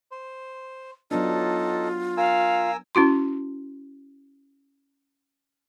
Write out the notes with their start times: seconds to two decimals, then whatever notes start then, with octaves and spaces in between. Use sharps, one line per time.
0.11 C5
1.11 F#3 B3 D4 D#4 F4 A4
2.17 A#4 F5 G#5 E6
2.95 C#4 E4 F#4 C6